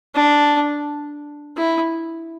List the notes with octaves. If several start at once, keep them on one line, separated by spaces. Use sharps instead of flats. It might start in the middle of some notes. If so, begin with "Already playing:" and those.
D4
E4